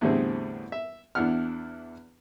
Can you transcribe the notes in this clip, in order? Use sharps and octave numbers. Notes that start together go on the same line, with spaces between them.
E2 A2 D3 G3 C4 G#4
E5
E2 D4 E4 F#5 F6